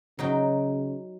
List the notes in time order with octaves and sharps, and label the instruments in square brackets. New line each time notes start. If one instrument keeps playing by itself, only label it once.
[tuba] C#3 [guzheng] F#3 D#4 G5